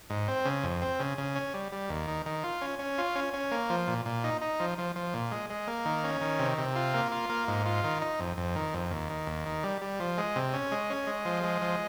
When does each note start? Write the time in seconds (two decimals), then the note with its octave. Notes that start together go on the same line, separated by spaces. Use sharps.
0.10 G#2
0.28 C4
0.45 C#3
0.63 F2
0.82 C4
1.00 C#3
1.18 C#3
1.36 C#4
1.54 G3
1.72 G3
1.89 D#2
2.07 D#3
2.26 D#3
2.44 F4
2.62 C#4
2.79 C#4
2.98 F4
3.15 C#4
3.34 C#4
3.51 A#3
3.70 F3
3.88 A#2
4.06 A#2
4.24 D#4
4.41 D#4
4.60 F3
4.78 F3
4.96 F3
5.14 A#2
5.32 G#3
5.50 G#3
5.67 A#3
5.85 D#3
6.04 C#4
6.21 D#3
6.39 C3
6.58 C3
6.76 F4
6.94 A#3
7.12 F4
7.29 A#3
7.48 G#2
7.66 F4
7.84 D#3
8.02 D#4
8.20 F2
8.37 F2
8.56 D#3
8.74 F2
8.91 D#2
9.10 D#3
9.27 D#2
9.46 D#3
9.63 G3
9.82 G3
10.00 F3
10.18 G#3
10.36 C3
10.54 C#4
10.72 G#3
10.90 C#4
11.07 G#3
11.25 F3
11.43 G#3
11.62 F3